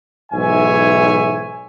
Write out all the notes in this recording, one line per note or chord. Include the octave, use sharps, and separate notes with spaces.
B1 G#2 E3 C#5 E5 G#5